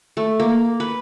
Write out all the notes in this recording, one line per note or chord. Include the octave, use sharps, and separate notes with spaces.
A3
A#3
B4